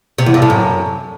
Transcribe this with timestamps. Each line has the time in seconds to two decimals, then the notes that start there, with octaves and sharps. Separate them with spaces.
0.18 C3
0.26 E2
0.34 G2
0.42 A2
0.50 F#2